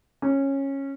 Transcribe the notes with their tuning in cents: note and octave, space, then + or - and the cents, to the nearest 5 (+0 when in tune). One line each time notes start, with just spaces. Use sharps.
C#4 -15